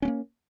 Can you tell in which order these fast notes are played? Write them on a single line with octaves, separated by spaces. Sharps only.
C#4 B3 A#3